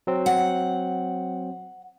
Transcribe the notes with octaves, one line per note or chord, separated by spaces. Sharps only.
F#3 C4
F#5